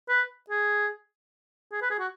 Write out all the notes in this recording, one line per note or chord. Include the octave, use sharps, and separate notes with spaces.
B4
G#4
G#4
B4
G#4
F#4